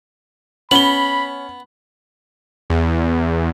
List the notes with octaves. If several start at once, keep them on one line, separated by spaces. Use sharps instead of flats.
B3 C#4 B5 F#7 G7
E2